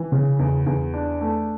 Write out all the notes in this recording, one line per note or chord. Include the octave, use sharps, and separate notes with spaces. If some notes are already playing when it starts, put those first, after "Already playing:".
Already playing: E3
C#3
E2
E2
D4
A3